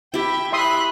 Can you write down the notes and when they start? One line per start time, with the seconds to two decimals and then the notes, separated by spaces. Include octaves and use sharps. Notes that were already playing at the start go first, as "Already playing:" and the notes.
0.14 E4 G4 E5 G5
0.53 E5 B5 C6 D#6 F#6